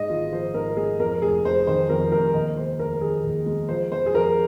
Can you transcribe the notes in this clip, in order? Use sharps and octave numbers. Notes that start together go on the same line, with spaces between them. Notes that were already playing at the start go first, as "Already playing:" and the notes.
Already playing: G#2 G#3 D#5
G#1 F4
F3 C5
G#2 A#4
G#3 G#4
F2 A#4
F1 G#4
F1 C5
D#3 C5
F2 A#4
F1 A#4
D#2 D#5
G#3 C5
F1 A#4
D#3 G#4
D#2
G#3
F3 C5
F2 C5
G#4
F2 A#4